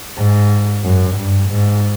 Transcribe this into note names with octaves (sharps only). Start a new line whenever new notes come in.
G#2
F#2
G2
G#2